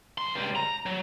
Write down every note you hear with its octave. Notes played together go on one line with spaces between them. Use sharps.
F#3 C6
C#2 G3
A#5
F#3